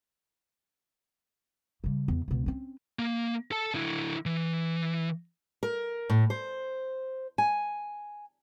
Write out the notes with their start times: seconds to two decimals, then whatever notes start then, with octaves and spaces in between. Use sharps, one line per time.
1.84 C#3 G3
2.08 E2
2.28 C#2 B2
2.46 C4 C#4
2.99 A#3
3.52 A4 A5
3.74 D3 E4
4.26 E3
5.63 A#4
6.10 A2
6.30 C5
7.38 G#5